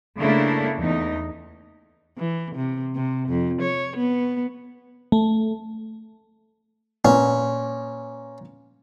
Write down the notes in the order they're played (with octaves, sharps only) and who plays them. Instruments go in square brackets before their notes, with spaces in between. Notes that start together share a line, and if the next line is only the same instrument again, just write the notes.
[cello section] C#3 A3 A#3 D4 E4
E2 D#4
[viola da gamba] E3
C3
C3
F2
C#5
B3
[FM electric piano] A3
[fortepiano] A#2 B4 [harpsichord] C#4